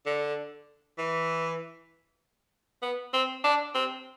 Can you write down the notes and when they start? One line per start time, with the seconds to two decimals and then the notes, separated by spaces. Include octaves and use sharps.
0.06 D3
0.98 E3
2.82 B3
3.13 C4
3.44 D4
3.74 C4